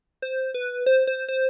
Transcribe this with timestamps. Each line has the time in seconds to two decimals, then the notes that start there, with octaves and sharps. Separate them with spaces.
0.22 C5
0.54 B4
0.86 C5
1.07 C5
1.29 C5